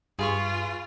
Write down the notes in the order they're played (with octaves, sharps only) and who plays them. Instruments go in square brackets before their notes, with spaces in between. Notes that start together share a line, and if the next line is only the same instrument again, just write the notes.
[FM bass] G2 [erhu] F4 [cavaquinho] G#4 B4 C#6